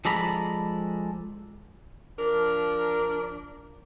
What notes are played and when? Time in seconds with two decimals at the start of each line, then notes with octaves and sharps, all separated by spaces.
0.05 F3 G#3 A4 D5 A#5 B5
2.18 F3 D4 A#4